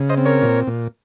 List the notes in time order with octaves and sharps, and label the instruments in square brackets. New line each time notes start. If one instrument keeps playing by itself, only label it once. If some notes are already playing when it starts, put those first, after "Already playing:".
Already playing: [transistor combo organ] C#3
C5 D#5
C4
A#4 C#5
A#2
A#2